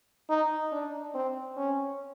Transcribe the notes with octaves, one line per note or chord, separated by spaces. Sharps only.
D#4
D4
C4
C#4